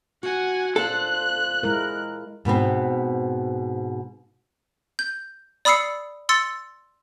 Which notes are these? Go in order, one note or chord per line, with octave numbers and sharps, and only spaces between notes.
F#4 F#5 G#5
A#2 F4 A4 C5 F#6
G#3 E4 A#4
G#2 B2 B3 C4
G6
D5 B5 D#6 E6 C7 C#7
C6 E6 A6 C#7